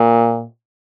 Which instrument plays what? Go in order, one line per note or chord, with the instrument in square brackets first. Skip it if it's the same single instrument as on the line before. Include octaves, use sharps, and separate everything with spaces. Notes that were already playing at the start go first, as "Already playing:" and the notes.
Already playing: [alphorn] A#2